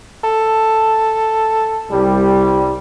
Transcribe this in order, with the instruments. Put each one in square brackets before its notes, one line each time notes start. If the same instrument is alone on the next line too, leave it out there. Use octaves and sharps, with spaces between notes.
[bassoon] A4
[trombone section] C2 G3